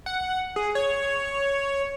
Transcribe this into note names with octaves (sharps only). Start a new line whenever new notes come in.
F#5
G#4
C#5